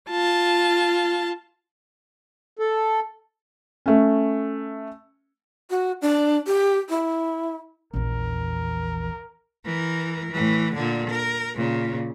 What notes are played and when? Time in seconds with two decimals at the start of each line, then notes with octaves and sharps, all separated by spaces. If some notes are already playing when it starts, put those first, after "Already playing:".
0.10 F4 A5
2.59 A4
3.86 A3 C#4
5.70 F#4
6.02 D4
6.47 G4
6.90 E4
7.94 A#1 E2 A#4
9.65 E3 A#4
10.32 A2 E3
10.75 A#2 D3
11.10 A#4
11.56 A#2 C#3